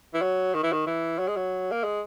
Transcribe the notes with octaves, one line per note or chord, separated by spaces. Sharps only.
E3
F#3
D#3
E3
D#3
E3
F#3
G#3
F#3
A#3
G#3